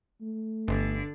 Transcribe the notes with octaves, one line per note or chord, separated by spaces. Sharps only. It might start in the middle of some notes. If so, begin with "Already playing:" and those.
A3
G1 D3 D4